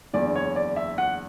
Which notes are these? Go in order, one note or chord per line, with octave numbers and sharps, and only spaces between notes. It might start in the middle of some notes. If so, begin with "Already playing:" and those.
F#1 E2 D3 D5
C#5
D5
E5
F#5